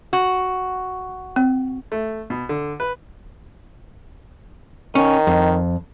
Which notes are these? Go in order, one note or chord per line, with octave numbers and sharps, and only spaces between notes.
F#4
C4
A3
B2
D3
B4
D#3 C#4
F2